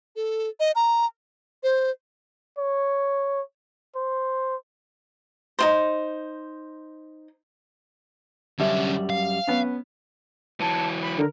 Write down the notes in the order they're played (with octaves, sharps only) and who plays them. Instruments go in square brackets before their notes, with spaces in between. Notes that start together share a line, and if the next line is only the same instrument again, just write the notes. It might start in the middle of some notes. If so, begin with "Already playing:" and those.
[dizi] A4
D#5
A#5
C5
[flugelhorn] C#5
C5
[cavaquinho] D#4 F4 C5
[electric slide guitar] F#2 G3 [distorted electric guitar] D3 C#4 [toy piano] G4 E5 A5
[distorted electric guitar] F5
[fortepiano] B3 C#4
[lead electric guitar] E3 F#3 [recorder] A5
[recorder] B5
[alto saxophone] D3 [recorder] A#4